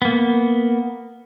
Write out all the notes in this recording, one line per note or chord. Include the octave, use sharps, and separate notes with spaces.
A#3 B3